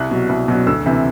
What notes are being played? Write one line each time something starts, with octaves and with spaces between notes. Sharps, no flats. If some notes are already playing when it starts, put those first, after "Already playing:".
Already playing: C2 F#6
B2 F#3
C2
B2 F#3
D2 E6
C3 E3